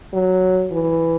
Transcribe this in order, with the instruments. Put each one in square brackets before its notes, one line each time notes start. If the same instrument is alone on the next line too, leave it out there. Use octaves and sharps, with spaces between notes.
[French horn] F#3
E3